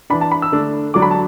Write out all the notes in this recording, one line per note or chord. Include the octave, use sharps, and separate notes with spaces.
E3 D4 B5
A5
B5
E6
D3 A3 D4
D3 F#3 D4 D6
B5
A5